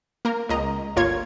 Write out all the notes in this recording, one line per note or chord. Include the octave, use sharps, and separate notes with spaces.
A#3 A#4
C#2 D#5 A#5
G1 A#3 F4 C#5 G#6